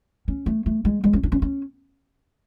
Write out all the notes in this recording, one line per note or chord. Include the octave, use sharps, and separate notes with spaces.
C#4
A3
A3
G#3
G#3
C#4
D4
C#4
C#4